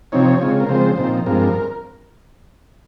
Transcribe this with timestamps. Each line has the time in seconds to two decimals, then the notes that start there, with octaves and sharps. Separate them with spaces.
0.12 C3 F3 C4 D#4 C#5
0.41 C#3 G#3 C4 F4
0.60 A#4
0.69 C#3 F3 G#3 C4 C5
0.98 A#2 F3 C4 D#4
1.26 G2 F3 G#3 C4 A#4